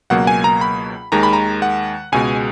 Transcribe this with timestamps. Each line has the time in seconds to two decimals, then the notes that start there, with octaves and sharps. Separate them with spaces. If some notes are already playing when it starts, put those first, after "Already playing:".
0.10 C#2 B2 F#3 A#3 F#5
0.27 G#5
0.44 A#5
0.61 B5
1.12 D#2 D#3 G#3 A#5
1.23 B5
1.33 A#5
1.62 F#5
2.12 C#2 B2 G#3 G#5